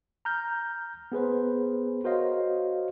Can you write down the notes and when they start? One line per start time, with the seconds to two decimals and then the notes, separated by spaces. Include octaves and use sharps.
0.25 A#5 F6 G6
1.12 B3 G#4 B4 C5
2.04 F#4 A#4 C5 C#5 D#5 F5